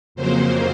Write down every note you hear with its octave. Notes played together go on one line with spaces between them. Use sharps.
F2 C#3 F#3 A#3 C5